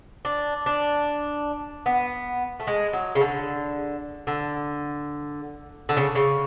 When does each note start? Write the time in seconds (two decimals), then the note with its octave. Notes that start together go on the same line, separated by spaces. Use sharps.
0.25 D4
0.66 D4
1.86 B3
2.60 A3
2.67 G#3
2.93 F#3
3.15 C#3
3.21 D3
4.27 D3
5.89 D3
5.97 C#3
6.15 C#3